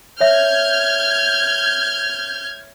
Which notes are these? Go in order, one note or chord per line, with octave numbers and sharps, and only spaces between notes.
C#5 E5 F6 G6 G#6